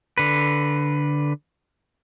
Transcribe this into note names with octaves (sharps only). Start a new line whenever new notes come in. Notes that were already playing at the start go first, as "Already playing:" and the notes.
D3 B4